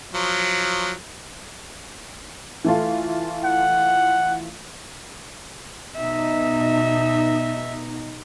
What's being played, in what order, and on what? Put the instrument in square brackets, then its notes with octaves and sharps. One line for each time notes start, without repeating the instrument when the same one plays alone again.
[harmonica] F3 F#3
[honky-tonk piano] E3 A3 F4
[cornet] F#5
[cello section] B2 D#4 [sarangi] E5